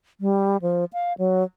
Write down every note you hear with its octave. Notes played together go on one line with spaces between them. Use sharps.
G3
F3
F5
F#3